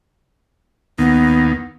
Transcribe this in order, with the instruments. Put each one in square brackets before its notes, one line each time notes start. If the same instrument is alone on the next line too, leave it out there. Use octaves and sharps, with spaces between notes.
[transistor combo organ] D#2 [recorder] B3